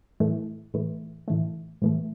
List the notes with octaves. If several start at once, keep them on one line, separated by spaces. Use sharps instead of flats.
A2 E3 A3
A2 E3 A3
A2 E3 A3
A2 E3 A3